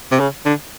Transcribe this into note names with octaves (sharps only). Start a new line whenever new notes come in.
C3
C#3
D3